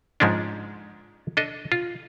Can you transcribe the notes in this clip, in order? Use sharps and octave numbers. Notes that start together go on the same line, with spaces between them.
G#2 F3 G#3 C#4 D4
D4 A4 D#5
F4